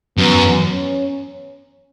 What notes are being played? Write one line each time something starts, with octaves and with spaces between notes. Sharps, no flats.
F#2 B3
C#4